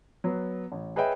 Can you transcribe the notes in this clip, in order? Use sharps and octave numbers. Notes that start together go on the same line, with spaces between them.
F#3 B3
A1
G#4 B4 C#5 D#5 E5 G5